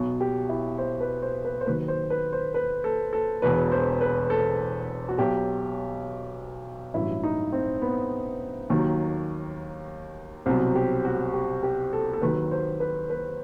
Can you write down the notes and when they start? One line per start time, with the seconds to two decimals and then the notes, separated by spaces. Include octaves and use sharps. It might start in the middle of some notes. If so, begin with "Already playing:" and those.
Already playing: B1 B2 F#3
0.20 G4
0.49 E4
0.78 C5
1.00 B4
1.22 C5
1.45 B4
1.61 C5
1.66 D#2 D#3 F#3 B4
1.88 C5
2.10 B4
2.33 C5
2.54 B4
2.84 A4
3.13 A4
3.42 E1 E2 B2 B4
3.72 C5
4.01 B4
4.30 A4
5.09 F#4
5.18 B1 B2 F#3 G4
6.94 A1 G2 F#3 E4
7.23 D#4
7.52 C4
7.82 B3
8.70 D#2 D#3 F#3
10.46 C2 B2 F#3 C4
10.75 G4
11.05 F#4
11.34 G4
11.63 G4
11.93 A4
12.13 A4
12.22 D#2 D#3 F#3 B4
12.51 C5
12.80 B4
13.10 B4